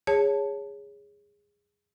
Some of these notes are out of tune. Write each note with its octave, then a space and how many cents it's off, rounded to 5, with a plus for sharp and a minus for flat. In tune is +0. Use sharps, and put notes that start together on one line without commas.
G#4 -15 C#5 +5 A5 +0